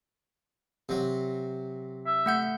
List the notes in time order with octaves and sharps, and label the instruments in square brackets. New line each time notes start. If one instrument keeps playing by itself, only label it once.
[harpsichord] C3 F#3
[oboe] E5
[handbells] A3 F#5 G6